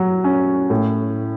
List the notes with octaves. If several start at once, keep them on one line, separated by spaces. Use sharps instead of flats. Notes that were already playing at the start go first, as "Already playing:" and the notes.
Already playing: F#3
C#4
A2